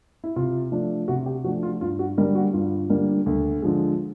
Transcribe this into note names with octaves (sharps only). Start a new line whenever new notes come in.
E4
C3 F4
F3 A3 D4
C3 F#4
G4
F3 A3 D4 F#4
F4
G2 F4
F#4
D3 G3 A#3 D4 A#4
F#4
G2 F4
D3 G3 A#3 D4
D2
D3 F3 G#3